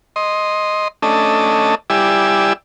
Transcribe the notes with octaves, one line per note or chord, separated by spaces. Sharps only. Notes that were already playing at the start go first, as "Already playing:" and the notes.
D#5 C6
A3 C#4 D4 A4 D#5
G3 E4 G4 D5 G#5 E6